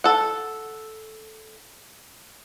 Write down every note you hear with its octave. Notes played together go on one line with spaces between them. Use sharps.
A4 F#5